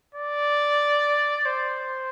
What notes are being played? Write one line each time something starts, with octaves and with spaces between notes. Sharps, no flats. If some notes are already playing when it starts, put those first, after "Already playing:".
D5
C5